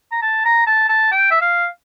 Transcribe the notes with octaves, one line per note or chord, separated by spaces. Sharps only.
A#5
A5
A#5
A5
A5
G5
E5
F5